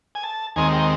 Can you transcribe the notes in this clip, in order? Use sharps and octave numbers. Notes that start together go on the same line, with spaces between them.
G#5
A5
D#2 D#3 G#3 C4 G#5
G5